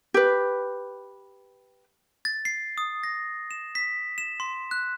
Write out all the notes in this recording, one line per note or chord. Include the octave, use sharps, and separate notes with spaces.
G4 B4
A6
C7
D#6
A#6
E7
B6
E7
C6
F#6